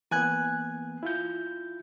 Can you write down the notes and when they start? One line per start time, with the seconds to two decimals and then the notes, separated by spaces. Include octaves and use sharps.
0.11 E3 A#3 B3 G#5 F#6 G#6
1.03 E4 F4 G6